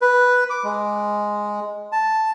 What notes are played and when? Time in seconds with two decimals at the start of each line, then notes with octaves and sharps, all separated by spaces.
0.02 B4
0.50 D6
0.64 G#3
1.92 A5